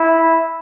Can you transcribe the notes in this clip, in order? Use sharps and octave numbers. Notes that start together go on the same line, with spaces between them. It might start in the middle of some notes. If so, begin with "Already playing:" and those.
Already playing: E4